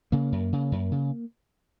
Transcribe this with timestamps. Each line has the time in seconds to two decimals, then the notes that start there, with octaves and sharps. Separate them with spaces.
0.12 C#3 A#3
0.32 F#2
0.53 C#3
0.72 F#2
0.92 C#3